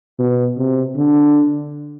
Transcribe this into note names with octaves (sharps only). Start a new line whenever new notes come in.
B2
C3
D3